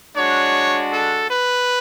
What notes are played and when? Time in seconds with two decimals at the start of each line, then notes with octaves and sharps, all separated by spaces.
0.15 G#3 D4 F#4 C#5
0.91 A4
1.29 B4